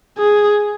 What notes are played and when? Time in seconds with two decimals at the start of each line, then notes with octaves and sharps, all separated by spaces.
0.18 G#4